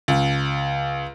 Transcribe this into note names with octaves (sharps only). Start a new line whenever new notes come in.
C#2